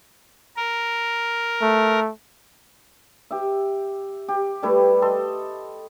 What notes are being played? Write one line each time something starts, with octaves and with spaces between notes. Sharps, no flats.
A#4
A3
G4 E5
G4
G3 A3 E4 B4
A4 D#5 C6